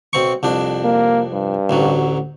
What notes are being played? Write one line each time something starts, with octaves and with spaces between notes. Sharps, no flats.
B1 C4 C#6
C2 F2 D4
A#3
G2
A1 D2 F#3